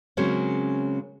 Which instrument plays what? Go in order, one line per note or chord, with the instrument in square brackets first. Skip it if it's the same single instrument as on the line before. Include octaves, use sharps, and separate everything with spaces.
[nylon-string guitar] C#3 F#3 G#3 A#3 C4 C#4